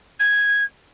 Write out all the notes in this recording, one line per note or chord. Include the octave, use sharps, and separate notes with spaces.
G#6